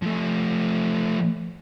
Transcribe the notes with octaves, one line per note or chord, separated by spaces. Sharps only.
F3 A3